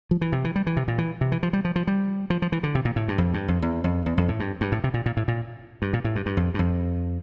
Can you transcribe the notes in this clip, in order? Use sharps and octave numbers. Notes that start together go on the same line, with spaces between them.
F3
E3
C3
E3
G3
E3
C3
A#2
E3
C3
E3
F3
G3
F3
F3
G3
F3
F3
E3
D3
C3
A#2
A2
G2
F2
G2
F2
E2
F2
E2
F2
A2
G2
G2
A2
C3
A#2
A#2
A2
A#2
G2
A#2
A2
G2
G2
F2
G2
F2